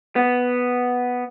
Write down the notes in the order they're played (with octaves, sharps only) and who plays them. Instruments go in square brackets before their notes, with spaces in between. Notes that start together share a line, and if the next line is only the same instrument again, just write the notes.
[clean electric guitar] B3